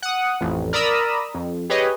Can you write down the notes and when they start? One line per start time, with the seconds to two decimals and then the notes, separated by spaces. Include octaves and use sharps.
0.02 F#5 D#6
0.41 A1 F2
0.73 A#4 D5 A#5 B5 D#6 E6
1.35 F2
1.70 G4 G#4 B4 C#5 D#5